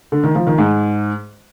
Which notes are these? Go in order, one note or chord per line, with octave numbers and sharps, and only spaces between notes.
D3
D#3
F3
D#3
G#2